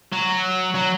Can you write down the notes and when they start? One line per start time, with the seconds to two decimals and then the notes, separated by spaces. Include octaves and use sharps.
0.13 F#3
0.75 F#3